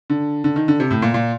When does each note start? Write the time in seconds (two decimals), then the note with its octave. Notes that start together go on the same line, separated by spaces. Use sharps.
0.10 D3
0.44 D3
0.56 D#3
0.68 D3
0.80 C3
0.90 A2
1.02 A#2
1.14 A#2